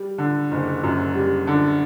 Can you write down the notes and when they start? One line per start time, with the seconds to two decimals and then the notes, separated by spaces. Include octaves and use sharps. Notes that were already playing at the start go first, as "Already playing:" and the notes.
Already playing: G3
0.18 D3
0.51 F#1
0.83 F#2
1.15 G3
1.47 D3